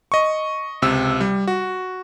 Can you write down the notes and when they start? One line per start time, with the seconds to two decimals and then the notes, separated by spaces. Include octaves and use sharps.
0.12 D#5 C#6
0.82 C#2 C3 E6
1.21 G3
1.48 F#4